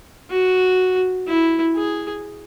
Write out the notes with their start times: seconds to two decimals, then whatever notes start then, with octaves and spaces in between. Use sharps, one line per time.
0.30 F#4
1.27 E4
1.75 G#4